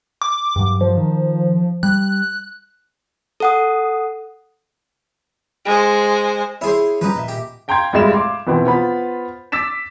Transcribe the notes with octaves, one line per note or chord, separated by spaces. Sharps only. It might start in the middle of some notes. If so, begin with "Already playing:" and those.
D6
G2 F#3
F3
D#3
G3 F#6
A4 F#5 D#6
G#3 C5
E4 G#4 C5 C#5
F3 G3 C#4 D#4 B4
A#2 D#5 E5
G4
F5 G5 A#5 C6 G6 G#6
F1 A2 G3 G#3 F5 E7
F5 C6 D6
F2 B2 E3 B3 C4
B3 F4 C5 B5
D6 E6 A6 B6 E7